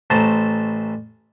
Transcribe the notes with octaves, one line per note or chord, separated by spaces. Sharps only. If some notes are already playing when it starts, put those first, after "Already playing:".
A1 A3 C5 A5 A#5